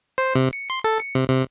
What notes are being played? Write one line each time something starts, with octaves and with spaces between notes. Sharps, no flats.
C5
C3
C#7
C6
A4
C#7
C3
C3